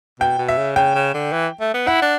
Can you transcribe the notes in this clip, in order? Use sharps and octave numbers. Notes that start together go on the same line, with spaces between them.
B2 G5
B2
E5
C#3
C#3 G5
C#3
D3
E3
A3
B3
E4 F#5
D4